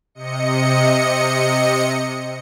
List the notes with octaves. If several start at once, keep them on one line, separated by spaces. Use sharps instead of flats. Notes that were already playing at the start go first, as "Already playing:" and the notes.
C3 D#5 C#7